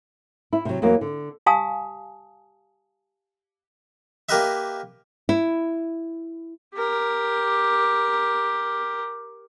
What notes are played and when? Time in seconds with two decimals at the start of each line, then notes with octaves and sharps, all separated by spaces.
0.53 E4
0.65 C3 F#3
0.82 E2 F#3 A#3
1.01 D3
1.46 G4 F5 G#5 A5 D#6
4.29 A#3 G4 A#4 B4 D#5 E5
5.29 E4
6.75 G4 A#4